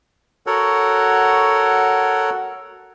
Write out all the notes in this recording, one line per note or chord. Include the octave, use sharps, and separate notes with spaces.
F#4 A4 A#4 C#5 F#5